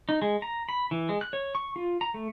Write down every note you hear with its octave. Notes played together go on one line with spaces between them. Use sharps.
D#4
G#3
A#5
B5
E3
G#3
F#6
C#5
C#6
F4
A#5
A3